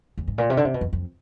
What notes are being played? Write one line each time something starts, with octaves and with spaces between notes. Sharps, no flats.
E2
G#2
A#2
C3
D3
C3
B2
F2
F2